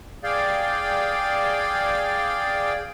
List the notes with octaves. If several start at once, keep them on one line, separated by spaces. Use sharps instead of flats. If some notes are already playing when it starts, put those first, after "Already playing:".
G#4 D5 F5 G5